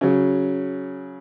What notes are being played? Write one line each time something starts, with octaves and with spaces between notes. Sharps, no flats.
C#3 F#3